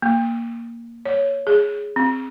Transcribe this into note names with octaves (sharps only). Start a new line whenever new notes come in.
A#3
C#5
G#4
C4